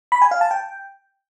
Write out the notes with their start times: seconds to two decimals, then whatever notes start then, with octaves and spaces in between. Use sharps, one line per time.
0.12 B5
0.22 G#5
0.31 F5
0.41 A5
0.51 G5